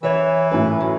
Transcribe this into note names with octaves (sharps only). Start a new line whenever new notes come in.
F#2 E3 C#5 E5
F#2 A2 B4
F#3